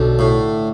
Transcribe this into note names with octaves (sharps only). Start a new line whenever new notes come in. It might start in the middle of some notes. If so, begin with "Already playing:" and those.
Already playing: B1 D3
A2